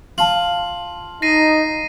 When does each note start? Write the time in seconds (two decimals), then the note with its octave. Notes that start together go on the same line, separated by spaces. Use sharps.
0.18 F4 A5 F#7
1.22 D#4 A#6 C7 D#7